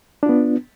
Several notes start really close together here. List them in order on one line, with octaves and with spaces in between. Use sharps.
D4 F4 B3